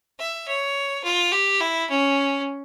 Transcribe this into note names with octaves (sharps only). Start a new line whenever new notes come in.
E5
C#5
F4
G4
E4
C#4